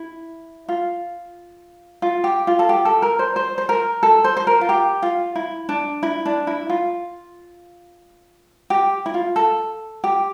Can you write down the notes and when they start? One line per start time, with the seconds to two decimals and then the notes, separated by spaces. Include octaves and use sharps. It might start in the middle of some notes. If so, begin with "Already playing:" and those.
Already playing: E4
0.69 F4
2.02 F4
2.24 G4
2.47 F4
2.59 A4
2.69 G4
2.85 A4
3.02 A#4
3.19 C5
3.36 C5
3.58 C5
3.69 A#4
4.03 A4
4.24 C5
4.37 C5
4.47 A#4
4.61 F4
4.69 G4
5.02 F4
5.36 E4
5.69 D4
6.03 E4
6.26 D4
6.47 E4
6.69 F4
8.70 G4
9.06 E4
9.14 F4
9.36 A4
10.04 G4